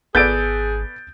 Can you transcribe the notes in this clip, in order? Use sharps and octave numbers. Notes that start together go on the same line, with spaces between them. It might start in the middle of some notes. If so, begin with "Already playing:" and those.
G#1 B3 G#4 A4 D5 G6 A6 D7